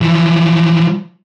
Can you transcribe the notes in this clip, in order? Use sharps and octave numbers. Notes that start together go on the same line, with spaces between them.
E3 F3